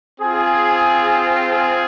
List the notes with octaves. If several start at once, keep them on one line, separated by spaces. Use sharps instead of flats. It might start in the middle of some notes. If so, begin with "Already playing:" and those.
C4 F4 G#4
G#4